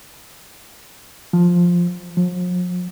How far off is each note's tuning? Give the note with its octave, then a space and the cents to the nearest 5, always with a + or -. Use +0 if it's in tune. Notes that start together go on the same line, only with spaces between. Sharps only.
F3 +5
F3 +40